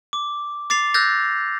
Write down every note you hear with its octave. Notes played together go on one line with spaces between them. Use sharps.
D6
D6 A6 C7 F7
E6 F#6 G6 A6 A#6